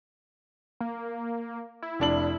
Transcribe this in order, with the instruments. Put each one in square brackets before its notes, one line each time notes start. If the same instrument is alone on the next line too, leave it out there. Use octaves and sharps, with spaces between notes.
[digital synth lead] A#3
E4
[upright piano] F1 D4 F#7